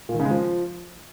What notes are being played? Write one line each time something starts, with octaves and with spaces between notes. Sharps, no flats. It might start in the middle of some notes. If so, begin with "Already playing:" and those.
A#2
D#3
C#3
G#3
F3